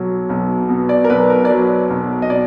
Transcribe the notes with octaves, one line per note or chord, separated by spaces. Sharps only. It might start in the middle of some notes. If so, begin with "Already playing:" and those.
Already playing: B1 F#3
B1
B2
D5
A#4
B1 B4
A#4
D5
F#3 B4
B1
D#5
B2 D5